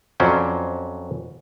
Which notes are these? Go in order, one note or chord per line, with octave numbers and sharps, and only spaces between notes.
F2 F#3 C#4 C5 D5